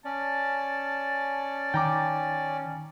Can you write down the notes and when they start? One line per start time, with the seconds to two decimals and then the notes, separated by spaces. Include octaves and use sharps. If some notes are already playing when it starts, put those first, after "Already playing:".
0.05 C#4 D5 A5
1.74 D#3 G5 A#5 D6